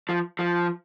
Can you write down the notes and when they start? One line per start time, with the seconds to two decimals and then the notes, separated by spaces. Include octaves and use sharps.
0.09 F3
0.39 F3